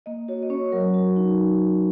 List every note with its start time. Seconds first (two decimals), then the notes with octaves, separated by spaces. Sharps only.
0.06 A#3 D#5
0.28 F#4 C#5
0.43 D#5
0.50 C#4 C#5
0.72 F#3 A#4
0.94 F#4
1.16 D#4